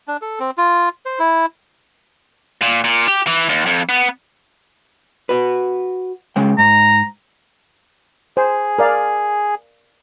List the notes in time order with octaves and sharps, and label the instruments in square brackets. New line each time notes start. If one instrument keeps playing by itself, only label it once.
[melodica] D4
A4
C4
F4
C5
E4
[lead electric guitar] A#2
A#2
G4
E3
D#2
F2
B3
[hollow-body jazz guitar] F#4 B4
C#3 G#3 G5
[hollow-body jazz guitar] G#2 [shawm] A#5
[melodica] G#4 [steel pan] C5
[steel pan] A#4 D5 F5